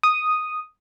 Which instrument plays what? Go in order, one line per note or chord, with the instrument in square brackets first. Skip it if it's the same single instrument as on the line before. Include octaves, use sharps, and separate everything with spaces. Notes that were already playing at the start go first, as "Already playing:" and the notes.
[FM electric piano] D#6